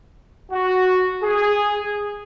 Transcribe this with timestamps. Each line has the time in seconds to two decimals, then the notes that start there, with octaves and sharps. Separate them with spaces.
0.51 F#4
1.23 G#4